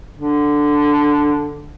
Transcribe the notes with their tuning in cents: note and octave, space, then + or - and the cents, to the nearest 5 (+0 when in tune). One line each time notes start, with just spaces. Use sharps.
D3 +0